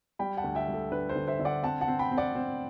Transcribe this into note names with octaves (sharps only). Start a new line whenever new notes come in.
G3 G5 B5
F#5 A5
D2
E5 G5
G3
A4
D3 B4
A4 C5
D3
C5 E5
D3 E5
D5 F#5
C4 F#5 A5
F#5 A5
C4
G5 B5
C4
D5 F#5
C4